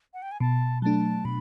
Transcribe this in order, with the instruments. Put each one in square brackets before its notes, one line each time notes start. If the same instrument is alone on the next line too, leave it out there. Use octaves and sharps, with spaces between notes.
[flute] F#5
G5
G#5
[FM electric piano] B2 [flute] A5
[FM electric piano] F#3 A3 D4 [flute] A5
[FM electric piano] B2 [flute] B5